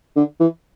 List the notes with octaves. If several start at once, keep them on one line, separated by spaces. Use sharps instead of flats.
D3
E3